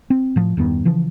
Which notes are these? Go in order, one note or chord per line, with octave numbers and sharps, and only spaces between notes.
C4
A2 F3
E2 G2 D#3 B3
C#3 E3 F3